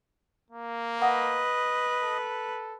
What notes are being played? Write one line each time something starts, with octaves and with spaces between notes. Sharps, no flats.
A#3
B4 D#5 F#5
A4